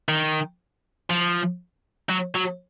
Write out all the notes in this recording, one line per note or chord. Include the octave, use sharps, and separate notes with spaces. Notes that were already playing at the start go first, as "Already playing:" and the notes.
D#3
F3
F#3
F#3